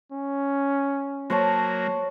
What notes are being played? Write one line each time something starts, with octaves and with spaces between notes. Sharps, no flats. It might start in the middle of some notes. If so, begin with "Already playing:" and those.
C#4
F#3 A#3 C5 C#5 A5